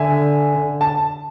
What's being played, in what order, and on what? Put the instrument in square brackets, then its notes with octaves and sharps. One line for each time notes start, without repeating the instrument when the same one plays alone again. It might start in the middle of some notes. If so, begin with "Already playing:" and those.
Already playing: [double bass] D3 [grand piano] E5 G#5
[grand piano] A5